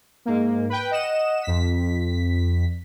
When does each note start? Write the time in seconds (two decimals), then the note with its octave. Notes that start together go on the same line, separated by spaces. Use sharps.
0.25 G#2 A#3
0.69 B4 G5
0.91 D#5 F#5 E7
1.43 F2 B6